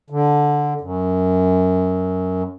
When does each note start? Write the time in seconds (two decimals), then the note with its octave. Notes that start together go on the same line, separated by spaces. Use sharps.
0.10 D3
0.81 F#2